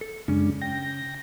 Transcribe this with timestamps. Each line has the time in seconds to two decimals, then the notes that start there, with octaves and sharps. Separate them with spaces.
0.01 A4
0.28 F#2 C#3 G#3 C#4 D4
0.62 G5 A#6